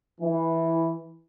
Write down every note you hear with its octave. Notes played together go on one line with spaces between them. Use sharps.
E3